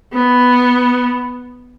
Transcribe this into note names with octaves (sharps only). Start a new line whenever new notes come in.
B3